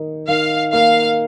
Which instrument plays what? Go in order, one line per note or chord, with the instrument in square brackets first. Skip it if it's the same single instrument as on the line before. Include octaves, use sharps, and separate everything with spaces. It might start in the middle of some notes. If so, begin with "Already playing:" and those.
Already playing: [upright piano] D#3 D#4
[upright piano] D#3 [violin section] F5
[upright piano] A#3 [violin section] F5